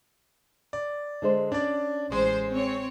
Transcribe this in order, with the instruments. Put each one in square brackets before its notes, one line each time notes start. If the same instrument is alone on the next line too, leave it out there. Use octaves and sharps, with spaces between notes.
[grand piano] D5
[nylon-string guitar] D3 G#3 C5
[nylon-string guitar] C#4 [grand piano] D4 D5
[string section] A1 C5 [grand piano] G#3
[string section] C4 C#5